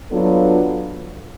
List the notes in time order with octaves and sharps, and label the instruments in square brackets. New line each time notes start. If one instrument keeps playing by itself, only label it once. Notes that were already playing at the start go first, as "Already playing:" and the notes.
[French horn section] F#3 B3 D4 F4 A4